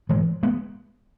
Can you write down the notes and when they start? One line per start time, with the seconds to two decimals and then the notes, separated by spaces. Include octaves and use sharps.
0.09 G#2 E3 G#3
0.43 G#3 B3